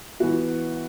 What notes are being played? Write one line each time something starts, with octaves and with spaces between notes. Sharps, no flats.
E3 B3 F#4